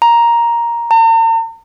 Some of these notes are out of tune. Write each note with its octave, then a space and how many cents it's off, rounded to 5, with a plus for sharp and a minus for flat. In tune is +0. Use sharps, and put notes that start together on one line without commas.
A#5 +10
A#5 -45